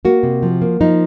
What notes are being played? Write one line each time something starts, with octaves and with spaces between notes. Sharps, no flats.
A#3 F#4
C3
F3
A#3
F3 D#4